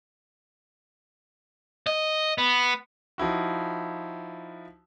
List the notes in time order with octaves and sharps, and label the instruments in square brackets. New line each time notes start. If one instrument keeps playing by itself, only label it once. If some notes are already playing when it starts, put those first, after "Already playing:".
[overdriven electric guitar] D#5
B3
[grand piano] F3 D#4 E4 F#4